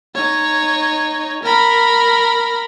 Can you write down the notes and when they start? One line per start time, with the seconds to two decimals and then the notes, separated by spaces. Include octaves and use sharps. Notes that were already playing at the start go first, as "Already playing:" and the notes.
0.15 D#4 C#5
1.43 A#4 B5